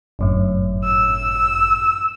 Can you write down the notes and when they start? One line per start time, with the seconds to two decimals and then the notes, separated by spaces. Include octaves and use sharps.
0.19 G1 F#2 A2
0.84 E6